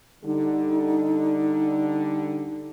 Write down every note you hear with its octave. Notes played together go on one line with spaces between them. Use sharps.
D3 G3 D#4